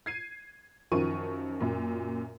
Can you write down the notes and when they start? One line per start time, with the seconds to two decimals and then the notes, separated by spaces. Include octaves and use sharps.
0.06 G#6 C7 D#7
0.92 F#2 D#3 F3 C#6 D#7
1.61 F#2 A#2